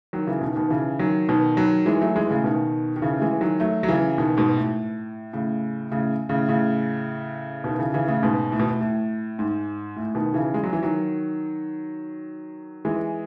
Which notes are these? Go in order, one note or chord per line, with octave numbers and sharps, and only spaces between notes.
D#3 F#3
C#3 E3
B2 D#3
B2 D#3
C#3 E3
D#3 F#3
B2 D#3
D#3 F#3
E3 G#3
F#3 A3
E3 G#3
A2 C#3
B2 D#3
D#3
C#3 E3
A3
E3 G#3
D#3 F#3
F#3 A3
F#3
C#3 E3
B2 D#3
G#2 B2
A2
A2 C#3
A2 C#3
A2 C#3
A2 C#3
B2 D#3
C#3 E3
C#3 E3
A2 C#3
G#2 B2
A2
B2
A2
A2
G#2
A2
B2 D#3
C#3 E3
G#3
F#3
E3
D#3 F#3
E3 G#3